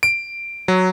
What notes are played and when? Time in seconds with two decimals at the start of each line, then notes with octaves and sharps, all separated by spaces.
0.03 D7
0.68 F#3